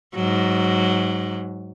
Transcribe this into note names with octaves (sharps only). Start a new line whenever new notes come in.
G#2 F#3